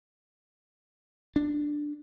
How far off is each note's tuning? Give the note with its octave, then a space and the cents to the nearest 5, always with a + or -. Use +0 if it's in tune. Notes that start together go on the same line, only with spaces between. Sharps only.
D4 +5